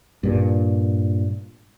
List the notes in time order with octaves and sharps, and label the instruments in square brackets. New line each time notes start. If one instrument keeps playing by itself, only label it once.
[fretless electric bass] G2 A#2